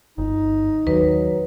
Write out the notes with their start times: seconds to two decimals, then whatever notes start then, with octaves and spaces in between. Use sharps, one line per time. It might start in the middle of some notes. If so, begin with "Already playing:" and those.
0.18 G1 D#4
0.87 D#2 F#3 B4